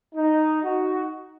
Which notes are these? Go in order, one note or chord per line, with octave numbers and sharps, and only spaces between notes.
D#4
D#4 F#4